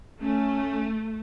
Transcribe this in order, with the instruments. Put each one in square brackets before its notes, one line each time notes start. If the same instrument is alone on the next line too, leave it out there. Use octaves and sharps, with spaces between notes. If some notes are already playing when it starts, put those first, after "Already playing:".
[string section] A3 [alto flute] C#4